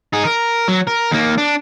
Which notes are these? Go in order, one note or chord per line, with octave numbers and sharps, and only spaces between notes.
D#4 G#4
A#4
F#3
A#4
D#2 A#3
D4